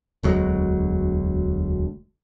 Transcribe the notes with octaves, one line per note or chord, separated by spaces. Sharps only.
E1 D2 F#3 G#3